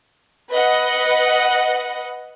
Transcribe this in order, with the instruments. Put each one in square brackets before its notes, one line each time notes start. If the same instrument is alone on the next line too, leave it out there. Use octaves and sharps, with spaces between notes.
[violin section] B4 D#5 F#5